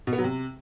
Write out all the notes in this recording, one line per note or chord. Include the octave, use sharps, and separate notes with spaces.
B2
B3
F#3
C3